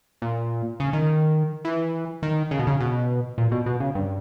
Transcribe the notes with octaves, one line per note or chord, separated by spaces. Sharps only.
A#2
C#3
D#3
E3
D#3
C#3
B2
C#3
B2
A#2
B2
B2
C#3
G2